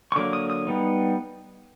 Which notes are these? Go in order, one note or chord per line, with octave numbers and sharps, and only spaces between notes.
C#6
D3 F#3 A#3 D6
D#6
D#6
G3 B3 D#4